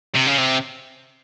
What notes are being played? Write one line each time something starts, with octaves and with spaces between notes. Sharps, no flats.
C3
C#3
C3